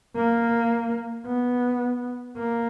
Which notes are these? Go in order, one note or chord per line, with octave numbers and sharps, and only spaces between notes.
A#3
B3
A#3